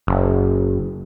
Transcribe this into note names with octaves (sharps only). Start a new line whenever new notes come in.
F#1